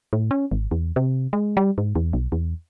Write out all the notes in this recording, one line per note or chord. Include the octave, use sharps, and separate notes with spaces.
A2
C#4
G#1
E2
C3
G#3
G3
G#2
E2
B1
E2